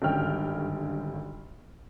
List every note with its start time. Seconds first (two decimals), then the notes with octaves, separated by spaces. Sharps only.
0.02 G#1 G2 D3 C#4 G5 F6